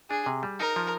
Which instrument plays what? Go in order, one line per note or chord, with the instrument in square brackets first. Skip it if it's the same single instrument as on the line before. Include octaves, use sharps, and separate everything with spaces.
[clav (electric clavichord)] D4 [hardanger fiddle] G#4
[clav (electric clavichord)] C3
G3
[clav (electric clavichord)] D#4 [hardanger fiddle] A#4
[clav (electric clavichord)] F3